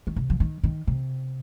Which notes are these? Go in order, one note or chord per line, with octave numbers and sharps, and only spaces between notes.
D#3
C3
F3
D#3
D#3
C3